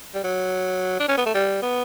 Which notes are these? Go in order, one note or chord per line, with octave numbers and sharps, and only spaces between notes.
G3
F#3
D4
C#4
B3
A3
G3
B3